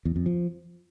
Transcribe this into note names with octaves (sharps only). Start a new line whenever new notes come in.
E2
F2
F3